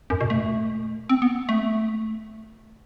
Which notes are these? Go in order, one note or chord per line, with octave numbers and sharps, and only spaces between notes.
F#2
B2
A3
C4
B3
A3